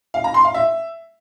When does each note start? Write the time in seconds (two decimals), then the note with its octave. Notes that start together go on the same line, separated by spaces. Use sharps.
0.14 F5
0.24 A#5
0.34 C6
0.44 F5
0.54 E5